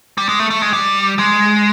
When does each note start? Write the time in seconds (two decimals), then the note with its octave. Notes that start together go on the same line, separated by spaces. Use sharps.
0.18 G3
0.29 G#3
0.40 A3
0.50 A3
0.62 G#3
0.73 G3
1.19 G#3